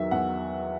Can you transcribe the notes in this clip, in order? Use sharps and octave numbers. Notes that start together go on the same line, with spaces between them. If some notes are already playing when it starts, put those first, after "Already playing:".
Already playing: E2 D#3 F#3 E5
E2 F#5